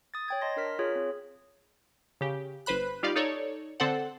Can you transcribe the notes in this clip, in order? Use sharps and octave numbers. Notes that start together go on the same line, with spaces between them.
D#6 A6
C#5 G5 G#6
D#5 A5 C6 A#6
D4 A#4 F6 B6
F4 G#4 C#5
C4
C#3 G4
G1 B4 C5 B5 F#6
G3 D#4 F4 G4 D5 F5
D#4 A4 C#5 D5
D3 C4 A4 C5 F#5